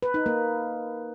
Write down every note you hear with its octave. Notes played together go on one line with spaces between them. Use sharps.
B4
D#4
A#3